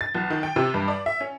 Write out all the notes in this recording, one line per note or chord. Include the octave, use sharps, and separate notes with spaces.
A6
B1
D#3
G5
C3
G2
D5
E5
C#4